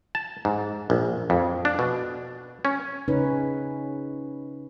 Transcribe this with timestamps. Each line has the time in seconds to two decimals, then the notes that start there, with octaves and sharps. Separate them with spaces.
0.15 A5
0.45 G#2
0.90 A#1
1.30 F2
1.65 D4
1.79 B2
2.65 C#4
3.08 C#3 C#4 D#4 B4